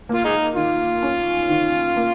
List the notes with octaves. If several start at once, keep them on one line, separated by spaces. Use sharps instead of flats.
A#3
F4
G#3 D#4
D#3 F4
C#4
D#3
A#3